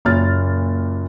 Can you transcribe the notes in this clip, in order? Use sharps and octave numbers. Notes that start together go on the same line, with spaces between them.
F#1 A#2 F6 A6